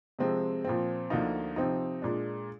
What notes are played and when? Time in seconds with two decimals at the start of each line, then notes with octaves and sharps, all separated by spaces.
0.19 C3 F3 G#3 C4
0.65 A#2 F3 C4
1.10 D2 D3 F3 A#3 D#4
1.56 C3 F3 C4 D#4
2.02 A#2 G#3 D4